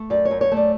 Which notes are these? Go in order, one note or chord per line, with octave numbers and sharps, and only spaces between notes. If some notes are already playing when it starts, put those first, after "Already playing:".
Already playing: A3
F#2 D5
C#5
F#2
C#5
A3 D5